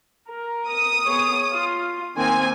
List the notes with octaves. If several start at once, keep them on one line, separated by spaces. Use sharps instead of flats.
A#4
D#6
B3 G#4 C#5
F4
D#3 A#3 C4 G#5